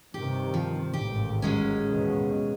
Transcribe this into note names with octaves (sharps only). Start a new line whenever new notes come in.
G2 C3 D#3 G4
F3
A1 D#2 G#2 G4
F#3 G#3 C#4
D#2 B2 E3